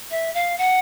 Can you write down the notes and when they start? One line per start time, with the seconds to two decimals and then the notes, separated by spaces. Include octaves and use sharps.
0.11 E5
0.34 F5
0.58 F#5